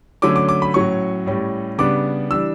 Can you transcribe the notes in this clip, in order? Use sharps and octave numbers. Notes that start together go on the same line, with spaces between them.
D3 F#3 A3 C#4 D6
D6
D6
B5
A2 F#3 C#4 C#6
A2 G3 C#4
C#3 G3 B3 D4 D6
E3 G3 D4 E6